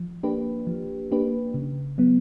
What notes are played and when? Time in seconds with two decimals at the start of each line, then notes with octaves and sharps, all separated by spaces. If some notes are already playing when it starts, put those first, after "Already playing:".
Already playing: F3
0.23 A#3 D4 G4 B4
0.67 F3
1.11 A#3 D4 G4 B4
1.54 C#3
1.98 F#3 B3